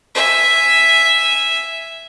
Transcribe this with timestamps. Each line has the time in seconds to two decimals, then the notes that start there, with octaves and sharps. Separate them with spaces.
0.15 E5 G#5